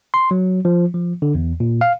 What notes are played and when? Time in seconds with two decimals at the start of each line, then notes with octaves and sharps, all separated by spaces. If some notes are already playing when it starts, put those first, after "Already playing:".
0.14 C6
0.31 F#3
0.65 F3
0.94 F3
1.22 D3
1.35 E2
1.60 A#2
1.81 F5